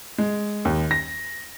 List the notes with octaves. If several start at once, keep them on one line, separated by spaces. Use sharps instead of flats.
G#3
D#2
A#6